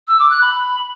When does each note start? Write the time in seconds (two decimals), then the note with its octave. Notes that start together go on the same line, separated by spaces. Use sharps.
0.07 E6
0.18 D6
0.29 F#6
0.41 B5